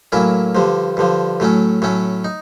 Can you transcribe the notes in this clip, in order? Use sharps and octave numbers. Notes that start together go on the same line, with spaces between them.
A2 F#3 A#3 C#4 E4
G2 D3 F3
G2 D3 F3
A2 F#3 A3 C#4
A2 F#3 A3 C#4
D#4